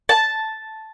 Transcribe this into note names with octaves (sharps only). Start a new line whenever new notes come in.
A5